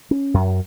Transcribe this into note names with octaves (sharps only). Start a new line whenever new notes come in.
C#4
F#2